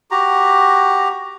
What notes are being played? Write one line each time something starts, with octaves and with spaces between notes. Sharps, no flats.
F#4 G4 A#5